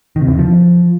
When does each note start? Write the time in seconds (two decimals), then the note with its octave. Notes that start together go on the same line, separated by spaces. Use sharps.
0.16 D#3
0.22 C3
0.27 E2
0.33 D3
0.39 F3